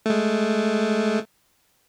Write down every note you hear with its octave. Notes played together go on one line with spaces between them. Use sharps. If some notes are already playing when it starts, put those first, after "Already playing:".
G#3 A3